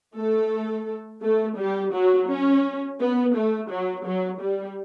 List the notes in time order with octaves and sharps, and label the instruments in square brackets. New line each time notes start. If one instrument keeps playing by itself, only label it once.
[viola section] A3 A4
A3 A4
G3 G4
F#3 F#4
C#4
B3
A3
F#3
F#3
G3